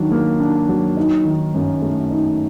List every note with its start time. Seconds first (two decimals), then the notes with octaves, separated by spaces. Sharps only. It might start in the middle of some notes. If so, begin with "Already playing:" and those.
Already playing: D#3 F#3 D4
0.11 A#3
0.40 D4
0.69 F#3
0.97 D#4
1.25 D#3
1.54 F#2
1.82 A3
2.11 D#4